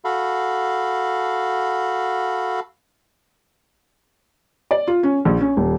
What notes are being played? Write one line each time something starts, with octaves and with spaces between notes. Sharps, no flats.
F#4 A4 F5 B5
D5
F4
C#4
A#1
C#4
D#1